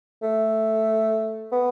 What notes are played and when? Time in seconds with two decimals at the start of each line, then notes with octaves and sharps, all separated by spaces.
0.22 A3
1.52 B3